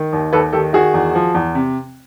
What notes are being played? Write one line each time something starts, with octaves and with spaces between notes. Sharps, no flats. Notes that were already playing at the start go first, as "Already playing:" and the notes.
Already playing: D#3
D#2
D#2 A4 B4
D#3 G4 A4
D#3 F#4 G#4
E2
F3
E2
C3